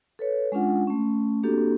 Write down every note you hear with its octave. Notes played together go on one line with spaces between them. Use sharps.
A4 B4 C#5
G#3 C#4 D4 F4 F#5
A3 C#4
A#3 C4 D4 F#4 G4 A4